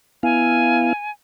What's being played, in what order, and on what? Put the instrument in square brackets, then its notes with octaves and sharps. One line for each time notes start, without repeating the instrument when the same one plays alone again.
[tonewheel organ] B3 E4 F5 [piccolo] G#5